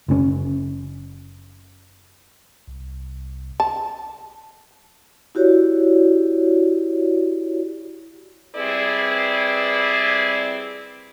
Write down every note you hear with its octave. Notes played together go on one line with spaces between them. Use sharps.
F#1 A2 C#4
C2
A5
E4 F#4 G4 C#5 D5
G3 C4 E4 G#4 B4 D5